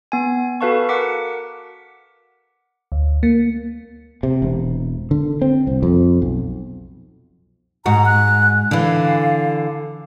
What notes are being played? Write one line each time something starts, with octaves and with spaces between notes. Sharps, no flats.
B3 G#5
F#4 A4 B4 F5 A5 C#6
A#4 F#5 D6 B6 C#7
D2
A#3
C3
E1
D3
C4
C2
F2
B1
G#2 F#4 A#5
F#6
D3 E3 F5